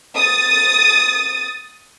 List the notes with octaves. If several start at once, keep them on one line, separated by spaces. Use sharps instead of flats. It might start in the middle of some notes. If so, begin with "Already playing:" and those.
D#6 A6